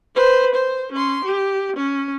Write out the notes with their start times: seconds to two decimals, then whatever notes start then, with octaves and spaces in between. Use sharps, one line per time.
0.15 B4 C5
0.55 C5
0.92 C#4 C6
1.24 G4
1.76 C#4